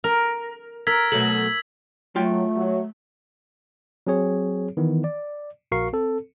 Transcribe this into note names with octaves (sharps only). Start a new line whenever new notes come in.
A#4
A#4 E6 G#6 B6
B2 F#3 A3 F#7
F#3 A3 F4 G5
F#3
F#3 C4 G#4 C#5
D#3 E3 B3
D5
A#1 F#4 A#4 F5 C#6 C7
C4 A4